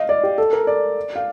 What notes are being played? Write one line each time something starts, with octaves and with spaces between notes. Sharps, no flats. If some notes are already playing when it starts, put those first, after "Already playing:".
Already playing: D#5 F5
D5
G4
A4
A#4
D5
F5